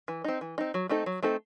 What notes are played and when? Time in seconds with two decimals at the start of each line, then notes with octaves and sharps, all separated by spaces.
0.08 E3
0.24 C4 D#4
0.41 E3
0.58 C4 D#4
0.74 F#3
0.89 A3 C4 D#4 A4
1.06 F#3
1.23 A3 C4 D#4 A4